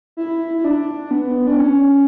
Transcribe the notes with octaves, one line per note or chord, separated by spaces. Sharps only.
E4
E4
D4
B3
D4
C#4